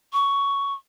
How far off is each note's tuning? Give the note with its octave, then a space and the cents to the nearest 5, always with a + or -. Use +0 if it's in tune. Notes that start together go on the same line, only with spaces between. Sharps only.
C#6 +10